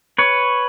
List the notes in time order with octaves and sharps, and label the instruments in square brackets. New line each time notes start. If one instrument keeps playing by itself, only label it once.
[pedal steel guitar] B4 C#5